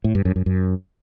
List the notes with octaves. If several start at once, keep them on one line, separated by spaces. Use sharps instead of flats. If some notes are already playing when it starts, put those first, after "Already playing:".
A2
G2
F#2
F#2
F#2